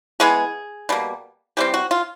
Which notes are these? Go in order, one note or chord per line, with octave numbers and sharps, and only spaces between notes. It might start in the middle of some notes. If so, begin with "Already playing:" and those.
E3 G#3 B3 G#4
B2 G3 A#3
E3 G3 C4 G4
F#4
F4